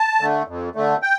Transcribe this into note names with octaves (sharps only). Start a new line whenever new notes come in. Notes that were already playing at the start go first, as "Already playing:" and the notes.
Already playing: A5
D3 A3
F2
D3 A3
G5